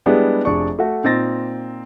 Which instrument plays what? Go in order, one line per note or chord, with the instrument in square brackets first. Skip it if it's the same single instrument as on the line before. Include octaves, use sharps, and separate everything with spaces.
[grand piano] G3 G#3 B3 D4 E4 G4
F1 D4 G#4 D5 C#6
A3 F#4
A#2 C4 D#4 A6 A#6